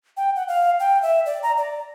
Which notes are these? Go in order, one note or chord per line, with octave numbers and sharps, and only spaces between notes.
G5
F#5
F5
G5
E5
D5
A#5
D5